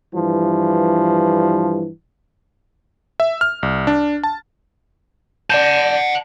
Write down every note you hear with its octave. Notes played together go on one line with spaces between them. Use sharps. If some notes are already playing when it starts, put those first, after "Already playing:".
G2 E3 F3 G3
E5
F6
C2
D4
A5
D5 F#5 A5 G6